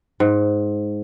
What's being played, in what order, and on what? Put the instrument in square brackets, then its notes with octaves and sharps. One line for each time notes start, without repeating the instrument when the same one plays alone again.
[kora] G#2